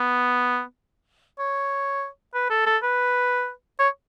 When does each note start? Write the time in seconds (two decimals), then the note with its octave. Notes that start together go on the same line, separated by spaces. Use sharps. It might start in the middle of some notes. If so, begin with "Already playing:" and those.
Already playing: B3
1.39 C#5
2.34 B4
2.50 A4
2.66 A4
2.83 B4
3.79 C#5